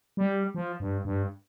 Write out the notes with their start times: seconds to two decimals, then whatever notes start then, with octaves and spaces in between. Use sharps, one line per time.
0.17 G3
0.55 F3
0.80 G2
1.05 G2